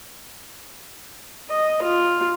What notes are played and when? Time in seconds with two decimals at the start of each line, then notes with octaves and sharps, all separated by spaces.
1.49 D#5
1.82 F4